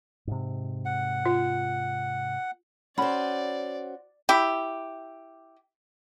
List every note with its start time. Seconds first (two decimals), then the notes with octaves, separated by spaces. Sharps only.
0.27 G#2 C3
0.85 F#5
1.26 F4
2.98 C#4 F#4 C5 D5 B5
4.29 E4 G4